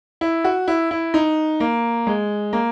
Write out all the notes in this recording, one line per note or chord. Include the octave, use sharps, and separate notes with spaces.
E4
F#4
E4
E4
D#4
A#3
G#3
A#3